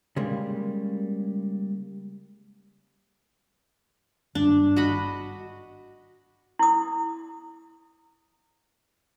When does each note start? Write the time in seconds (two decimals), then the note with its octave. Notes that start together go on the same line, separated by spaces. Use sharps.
0.16 C#3 G3 G#3 A#3
4.35 G#1 G2 D4
4.76 F#4 D#5 B5
6.59 E4 D#6